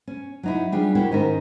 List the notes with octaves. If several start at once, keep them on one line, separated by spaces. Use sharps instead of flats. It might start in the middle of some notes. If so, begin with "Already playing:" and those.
C#4
F#3 D#4 E4
G3 D4 F4 G#4
E4 F#4 G4 A#4 C#5
G#2 D#3 C#4 D#4 A#4